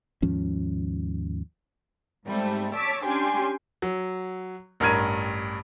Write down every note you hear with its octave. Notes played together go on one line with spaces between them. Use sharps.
D#2 G#2 F3 C#4
G#2 G3 A3 C4
C#5 A5 D6 E6 B6
C#4 D4 G4 G5 G#5 C6
F#3
A1 G2 A#4 F6 G#6 D#7